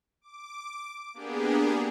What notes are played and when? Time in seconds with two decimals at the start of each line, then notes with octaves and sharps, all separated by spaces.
0.21 D6
1.14 A#3 B3 D4 G4 G#4